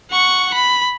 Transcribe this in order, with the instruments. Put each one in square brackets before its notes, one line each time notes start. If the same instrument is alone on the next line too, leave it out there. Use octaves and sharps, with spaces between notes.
[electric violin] F#5 C#6
B5